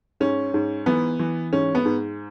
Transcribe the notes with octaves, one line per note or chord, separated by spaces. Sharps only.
G#2 C#4
G#2
E3 B3
E3
G#2 C#4
B3
G#2